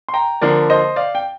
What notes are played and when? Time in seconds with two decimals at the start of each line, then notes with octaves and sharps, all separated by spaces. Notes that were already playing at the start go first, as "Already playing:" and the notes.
0.08 C6
0.14 G5 A#5
0.41 D3 F3 A#3 A#4 D5
0.70 C5 D#5
0.96 D5 F5
1.15 G5